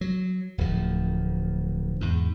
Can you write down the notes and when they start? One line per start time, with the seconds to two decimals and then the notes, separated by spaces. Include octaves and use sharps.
0.01 F#3
0.58 D1 D2 F3
2.01 E2 G#2